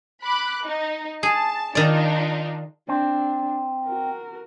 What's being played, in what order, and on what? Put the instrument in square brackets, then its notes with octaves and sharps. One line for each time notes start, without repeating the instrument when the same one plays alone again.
[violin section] B5 D6 F#6
D#4
[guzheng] G#4 [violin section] A5
[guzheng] D#3 D5 [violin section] D4 D#4 F4
[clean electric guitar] C4 [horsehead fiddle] D4
[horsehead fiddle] F#4 A#4